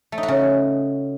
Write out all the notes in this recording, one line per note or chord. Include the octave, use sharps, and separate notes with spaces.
A3
D#4
F#4
C#3